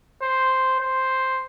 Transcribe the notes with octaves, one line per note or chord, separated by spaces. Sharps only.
C5
C5